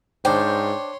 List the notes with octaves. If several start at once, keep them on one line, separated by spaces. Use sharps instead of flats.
G#2 D4 C5 C#5 G5 C6